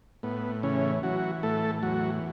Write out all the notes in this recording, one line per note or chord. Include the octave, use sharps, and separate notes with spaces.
A2 B3
C#3 E3 C#4
E3 F#3 F#4
A2 A3 A4
E2 F#3 F#4